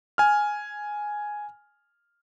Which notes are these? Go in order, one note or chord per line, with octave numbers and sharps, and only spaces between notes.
G#5 F6